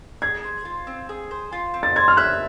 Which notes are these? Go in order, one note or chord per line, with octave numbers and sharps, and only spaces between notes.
G#4 G#6
C5
F4
C4
G#4
C5
F4
C4
A6
C5 G#6
F6
E5 F#6